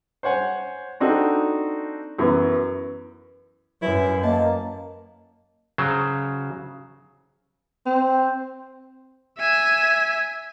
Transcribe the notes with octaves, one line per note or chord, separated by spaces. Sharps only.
C5 C#5 F#5 G#5
C4 D4 D#4 F#4 A4
F#2 E3 B3 E4
F#2 E4 B4 G#5
A#3 D#5 A5
C#3 F#3 C5
C4
E5 G#5